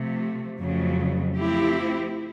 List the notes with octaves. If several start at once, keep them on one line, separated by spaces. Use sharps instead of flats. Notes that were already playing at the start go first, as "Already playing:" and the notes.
Already playing: C3 F3 A3
F2 C#3 F#3 A3
F3 A3 C4 E4 G4